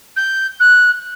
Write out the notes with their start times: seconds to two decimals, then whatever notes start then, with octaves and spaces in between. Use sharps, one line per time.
0.16 G6
0.59 F#6